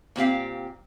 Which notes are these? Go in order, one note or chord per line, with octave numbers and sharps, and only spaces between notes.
A#2 C4 G4 F5